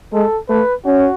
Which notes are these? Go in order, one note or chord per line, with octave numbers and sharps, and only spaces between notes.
G#3 A4
A3 B4
C#4 F#4